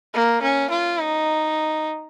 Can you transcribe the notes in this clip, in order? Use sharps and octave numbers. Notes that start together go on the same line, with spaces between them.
A#3
C#4
F4
D#4